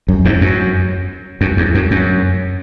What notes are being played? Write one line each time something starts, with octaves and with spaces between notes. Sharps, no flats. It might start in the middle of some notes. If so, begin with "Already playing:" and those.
F#2
E2 G#2
F#2
F#2
E2
F#2
F#2